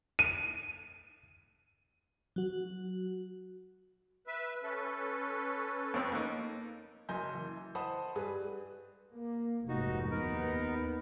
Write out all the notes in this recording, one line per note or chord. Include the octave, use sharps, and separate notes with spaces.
D#7
F#3 F#4
B4 E5
C#4 A4 B4
F2 C4
A#3 D#4
F#1 F#2 D#5 G#5 C6 G6
E3
C5 D#5 F#5 A5 B5 D#6
G2 G3 G#4 B4
A#3
F1 G#2 D#4 F#4
D#2 B3 D#4 A#4